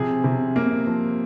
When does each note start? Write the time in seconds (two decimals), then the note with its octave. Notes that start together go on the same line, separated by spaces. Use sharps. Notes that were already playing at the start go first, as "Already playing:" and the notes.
Already playing: C3 F3 G#4
0.24 C3
0.56 A#3
0.87 F3